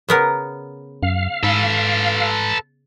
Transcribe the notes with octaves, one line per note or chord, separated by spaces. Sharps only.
C#3 B3 A#4
F#2 F5
G#2 A4 B4